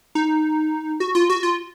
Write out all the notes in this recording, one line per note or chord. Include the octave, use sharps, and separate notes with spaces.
D#4
F#4
F4
F#4
F4